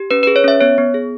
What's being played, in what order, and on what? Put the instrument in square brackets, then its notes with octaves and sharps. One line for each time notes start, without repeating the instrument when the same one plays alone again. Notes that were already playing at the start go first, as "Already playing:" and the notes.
Already playing: [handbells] G4
C#4 B4
B4
G#4
C#5
C#4 E5
B3 C#5
B3
G#4